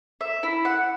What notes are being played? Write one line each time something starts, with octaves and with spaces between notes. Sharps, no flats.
E5
E4
F#5